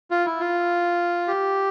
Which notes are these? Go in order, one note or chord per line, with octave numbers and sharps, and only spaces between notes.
F4
E4
F4
G4